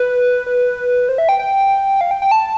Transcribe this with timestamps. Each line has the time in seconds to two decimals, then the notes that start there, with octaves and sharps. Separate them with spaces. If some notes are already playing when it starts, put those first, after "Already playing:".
Already playing: B4
0.46 B4
1.09 C5
1.18 E5
1.29 G5
1.39 G5
2.01 F5
2.11 G5
2.22 G5
2.32 A5